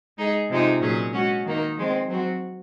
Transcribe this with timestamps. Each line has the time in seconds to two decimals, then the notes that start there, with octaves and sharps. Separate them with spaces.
0.18 G#3 D#4 G#4
0.50 C3 F3 G#3 D#4
0.81 A#2 F#3 C#4 G#4
1.13 G#3 C#4 F#4
1.45 D#3 A#3 D#4
1.77 F3 G#3 C4
2.08 F#3 C4 F#4